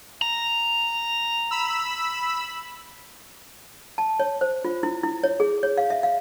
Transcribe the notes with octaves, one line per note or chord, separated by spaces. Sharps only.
A#5
B5 E6
A5
C#5
C5
F4
E4
E4
C#5
G#4
C#5
F5
E5
F5